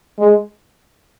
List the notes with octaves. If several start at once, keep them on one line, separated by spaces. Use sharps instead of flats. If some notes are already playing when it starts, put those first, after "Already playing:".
G#3